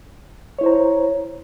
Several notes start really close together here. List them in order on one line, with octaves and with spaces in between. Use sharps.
C#5 E4 C5 A#5